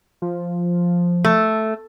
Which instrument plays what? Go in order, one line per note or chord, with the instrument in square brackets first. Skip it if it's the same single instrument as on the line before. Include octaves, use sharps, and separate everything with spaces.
[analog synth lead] F3
[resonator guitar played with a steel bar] A3